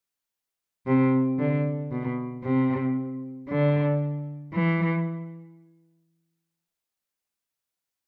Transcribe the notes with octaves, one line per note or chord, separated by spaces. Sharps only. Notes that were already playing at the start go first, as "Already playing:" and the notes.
C3
D3
B2
C3
D3
E3